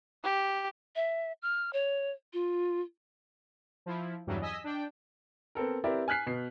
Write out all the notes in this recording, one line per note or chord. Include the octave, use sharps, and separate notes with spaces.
G4
E5
F6
C#5
F4
F3 E4
E2 G2 C#3 E3 F#3 G3
D#5 G#5 E6 B6
D4 G5
B3 C4 A4 A#4
C4 E4 G4 A#4 B4 D5
G#5 F6 F#6 B6 C7
B2 B3 C7